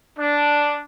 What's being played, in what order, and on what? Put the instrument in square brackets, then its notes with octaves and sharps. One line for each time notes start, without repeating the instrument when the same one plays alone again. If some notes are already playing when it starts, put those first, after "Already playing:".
[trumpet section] D4